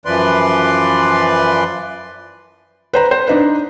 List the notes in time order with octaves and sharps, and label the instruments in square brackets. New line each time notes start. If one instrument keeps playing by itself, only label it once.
[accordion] F#2 E3 F3 B4 D5 C6
[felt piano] B4 C5 A#5
C5
D4 D#4 B4